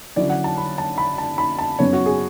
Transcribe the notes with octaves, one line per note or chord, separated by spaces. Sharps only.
D3 F#3 C#4 E4 D5
F#5
A5
B5
A5
B5
A5
B5
A5
F#2 C#3 F#3 B3 C#5
F#4
G#4